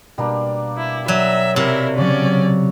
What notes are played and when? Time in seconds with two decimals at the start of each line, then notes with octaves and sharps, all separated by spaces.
0.18 B2 G3 A#3 D4
0.77 E4
1.08 F#3 E5
1.56 C3 E4 A#4 C#6
1.98 C#3 F#3 C#4 C#5 D5